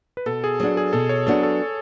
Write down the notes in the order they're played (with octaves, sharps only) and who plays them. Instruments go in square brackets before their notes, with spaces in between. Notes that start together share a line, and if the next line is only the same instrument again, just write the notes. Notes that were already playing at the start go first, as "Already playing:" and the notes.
[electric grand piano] B4
[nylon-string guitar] B2 [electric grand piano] A4
[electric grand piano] G#4
[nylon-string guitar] F#3 B3 D4 F#4 [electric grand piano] G#4
[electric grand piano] G#4
[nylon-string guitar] B2 [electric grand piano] A4
[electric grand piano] C#5
[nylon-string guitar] F#3 B3 D4 F#4 [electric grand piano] A4
[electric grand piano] A4